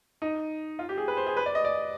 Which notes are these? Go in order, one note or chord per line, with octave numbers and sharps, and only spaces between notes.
D#4
F4
G4
G#4
B4
C5
G#4
B4
D5
D#5
D5